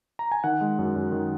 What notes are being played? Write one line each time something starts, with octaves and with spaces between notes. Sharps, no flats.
A#5
G#5
D#3 F#5
G#3
F#2
F#2
D#3